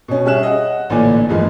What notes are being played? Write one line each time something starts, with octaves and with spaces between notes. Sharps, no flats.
B2 C#4
G3 C#4 G#4 E5 F#6 E7
D#5 F#5
A1 A#2 D3 D5 G#5
E2 G2 F3 G#3 A#3